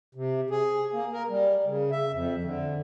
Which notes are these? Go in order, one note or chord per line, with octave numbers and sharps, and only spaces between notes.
C3
G#4
A#3
A#4
G3
C#3
E5
F2
D3